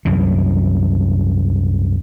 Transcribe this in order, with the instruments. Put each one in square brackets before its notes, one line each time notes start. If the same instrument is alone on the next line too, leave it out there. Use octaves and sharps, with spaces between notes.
[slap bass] C2 F#2 E3